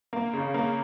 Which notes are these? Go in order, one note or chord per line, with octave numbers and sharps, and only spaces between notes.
A#3
C#3
A#3